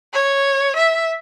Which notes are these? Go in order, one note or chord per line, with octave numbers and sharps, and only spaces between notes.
C#5
E5